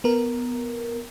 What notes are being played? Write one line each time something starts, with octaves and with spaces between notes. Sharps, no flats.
B3 A#4